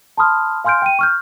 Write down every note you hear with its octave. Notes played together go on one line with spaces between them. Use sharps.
A5 B5 C6 D#6 F6
F5 G#5 C6 F6 G6 D7
G5 D#7
C#6 F6 G6